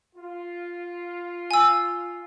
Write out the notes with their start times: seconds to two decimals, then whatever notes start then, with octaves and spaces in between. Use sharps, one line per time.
0.16 F4
1.51 G#5 E6